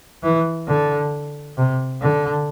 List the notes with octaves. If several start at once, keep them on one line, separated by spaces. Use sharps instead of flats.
E3
D3
C3
D3